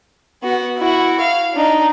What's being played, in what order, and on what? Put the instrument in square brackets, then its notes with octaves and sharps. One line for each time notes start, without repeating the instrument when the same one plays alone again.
[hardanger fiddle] B3 F#4
E4 F#4
F5
D4 D#4